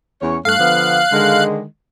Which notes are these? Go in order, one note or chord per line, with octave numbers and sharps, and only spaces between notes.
E2 C#4 C#5
G2 A3 F5 F#6
D3 F3 B3
D3 D#3 G#3